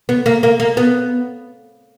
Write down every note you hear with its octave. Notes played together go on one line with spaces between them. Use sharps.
B3
A#3
A#3
A#3
B3